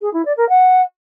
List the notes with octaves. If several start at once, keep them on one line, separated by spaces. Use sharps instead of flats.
G#4
E4
D5
A#4
F#5